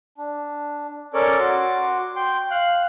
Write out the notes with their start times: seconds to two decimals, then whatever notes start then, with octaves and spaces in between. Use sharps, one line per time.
0.18 D4
1.14 C#4 A4 A#4 C#5 D5
1.39 F#4 C6 D6
2.16 G5 C6
2.51 F5 F#6